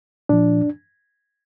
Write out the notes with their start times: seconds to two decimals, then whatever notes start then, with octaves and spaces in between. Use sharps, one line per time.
0.29 A#2 F3 D4